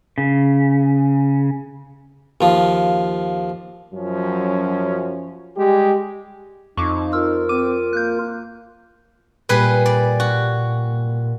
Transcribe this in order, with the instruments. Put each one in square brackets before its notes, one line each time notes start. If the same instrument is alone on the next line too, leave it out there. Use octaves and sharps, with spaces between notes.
[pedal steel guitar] C#3
[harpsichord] D#2 F3
[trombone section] F#2 F3 F#3 C#4
G3 G#3 G4
[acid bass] F2 [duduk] D#4 [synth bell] C#6 D6
[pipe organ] F4 A#4 [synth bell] E6
[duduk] C4 [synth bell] D6 D#7
[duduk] A#3 [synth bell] F#6 G6
[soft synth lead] A#2 [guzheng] G3 G#4 B4
[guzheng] D5
F#4